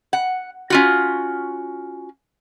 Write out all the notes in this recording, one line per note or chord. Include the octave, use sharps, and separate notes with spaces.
F#5
C#4 F4 F#4